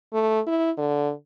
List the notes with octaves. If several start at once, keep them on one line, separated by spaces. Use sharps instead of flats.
A3
E4
D3